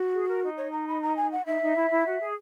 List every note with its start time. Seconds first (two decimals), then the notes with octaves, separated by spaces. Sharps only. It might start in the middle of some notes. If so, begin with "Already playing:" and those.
Already playing: F#4
0.14 G#4
0.28 A#4
0.43 D#4
0.57 C#5
0.72 A#5
0.88 B5
1.02 A#5
1.17 G#5
1.32 F#5
1.46 D#4 E5
1.61 D#4
1.75 E4
1.90 E4
2.05 F#4
2.20 G#4